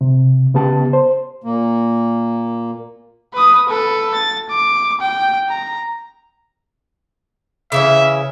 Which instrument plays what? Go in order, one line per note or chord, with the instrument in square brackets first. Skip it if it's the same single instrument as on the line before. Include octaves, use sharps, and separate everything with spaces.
[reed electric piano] C3
C#3 B3 G4 A5
C5
[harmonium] A#2 A#3
[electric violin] B4 D#6
A4 B4
A6
D6
G5
A#5
[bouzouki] C#3 E3 C#4 [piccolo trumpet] E5